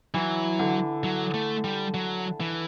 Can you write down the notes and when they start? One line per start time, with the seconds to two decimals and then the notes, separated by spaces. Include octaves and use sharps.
0.14 E3 F#3
0.59 D3
1.04 F#3
1.34 A3
1.64 G3
1.94 F#3
2.40 E3